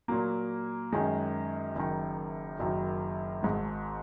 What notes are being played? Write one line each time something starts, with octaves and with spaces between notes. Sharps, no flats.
A#2 F#3 A#3
F#2 D#3 G#3 C#4
F#1 F#2 D#3
F#1 F#2 D#3 F#3
G#1 G#2 G#3